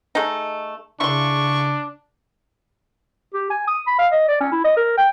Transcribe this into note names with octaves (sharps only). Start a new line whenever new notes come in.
G#3 A3 D#4
C#3 D4 E4 C6 C#6
G4
G#5
D#6
B5
F5
D#5
D5
C#4
E4
D#5
A#4
G5